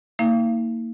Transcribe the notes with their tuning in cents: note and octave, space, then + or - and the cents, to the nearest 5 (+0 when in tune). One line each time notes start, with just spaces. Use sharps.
A#3 -25 D#4 +45 F5 -35